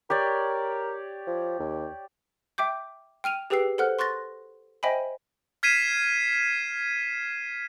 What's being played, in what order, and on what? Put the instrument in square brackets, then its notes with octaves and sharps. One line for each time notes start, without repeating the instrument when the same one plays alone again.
[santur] G4 C#5 D5 [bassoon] A#4
[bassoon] F3
D#2
[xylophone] E5 G5 D6 G6
G5 F6 D#7 F7
G4 G#4 B4 G5 E6 C7
A4 C5 F#5 F6 F#6
C6 C#6 F#6 A6 A#6
C5 D#5 E5 G5 G#5 B5
[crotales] F6 G#6 B6 C7 D#7 E7